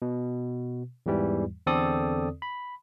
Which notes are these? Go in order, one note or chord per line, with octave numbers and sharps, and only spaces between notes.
B2
E2 G#2 E3 G3
E2 D3 C4 A4 D5 D#6
B5